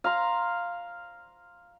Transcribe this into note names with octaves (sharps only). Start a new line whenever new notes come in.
F5 A#5 C6